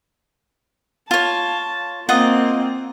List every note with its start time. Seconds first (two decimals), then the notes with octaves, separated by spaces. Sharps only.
1.11 F4 C#5 A5
2.09 A#3 C4 F4 D#5 F#5